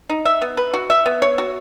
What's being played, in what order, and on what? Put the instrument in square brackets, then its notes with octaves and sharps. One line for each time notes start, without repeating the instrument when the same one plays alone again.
[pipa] D#4
E5
B3
B4
F#4
E5
B3
C#5
F#4